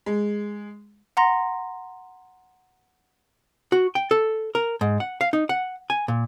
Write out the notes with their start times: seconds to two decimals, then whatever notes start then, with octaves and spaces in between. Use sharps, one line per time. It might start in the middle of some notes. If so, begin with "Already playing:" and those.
0.06 G#3
1.17 F#5 A#5 C6 A#6
3.72 F#4
3.95 G5
4.11 A4
4.55 A#4
4.81 G#2
5.00 F#5
5.21 F5
5.33 D#4
5.49 F#5
5.90 G#5
6.08 A#2